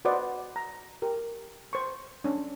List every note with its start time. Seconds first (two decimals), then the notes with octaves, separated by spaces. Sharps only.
0.05 F#4 B4 C5 D5 D#5 F#5
0.56 A#5
1.02 G4 A#4
1.73 C5 C#6
2.24 C#4 D4